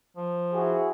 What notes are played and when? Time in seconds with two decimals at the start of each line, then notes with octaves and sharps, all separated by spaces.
0.17 F3
0.53 E4 F#4 G#4